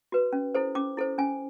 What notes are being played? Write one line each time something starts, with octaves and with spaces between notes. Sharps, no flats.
F#4 B4
C#4
E4 A4 C5
C#4 D6
E4 A4 C5
C#4 G#5